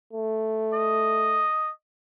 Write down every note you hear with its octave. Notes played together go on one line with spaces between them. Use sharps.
A3
D#5